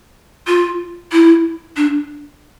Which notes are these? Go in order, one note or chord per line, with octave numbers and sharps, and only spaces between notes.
F4
E4
D4